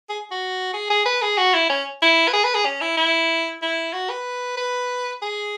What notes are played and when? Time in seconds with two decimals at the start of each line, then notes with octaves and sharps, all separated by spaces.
0.09 G#4
0.31 F#4
0.74 G#4
0.90 G#4
1.06 B4
1.22 G#4
1.38 F#4
1.54 E4
1.70 C#4
2.02 E4
2.28 B4
2.33 G#4
2.44 B4
2.55 G#4
2.65 C#4
2.81 E4
2.97 E4
3.62 E4
3.93 F#4
4.10 B4
4.57 B4
5.22 G#4